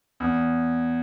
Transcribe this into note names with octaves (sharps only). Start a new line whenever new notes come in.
E2